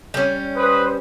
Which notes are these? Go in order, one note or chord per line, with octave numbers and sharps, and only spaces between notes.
G3 C#4
B4 C5 D#6